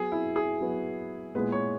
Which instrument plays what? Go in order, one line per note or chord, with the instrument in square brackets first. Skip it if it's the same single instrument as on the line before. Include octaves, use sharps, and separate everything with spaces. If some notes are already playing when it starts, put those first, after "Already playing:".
Already playing: [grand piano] F#3 B3 F#4 B4 [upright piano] G#4
[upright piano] E4
G#4
[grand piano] F#3 B3 F#4 B4
[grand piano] A#2 G#3 B3 E4 G#4 [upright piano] B4
[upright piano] C#5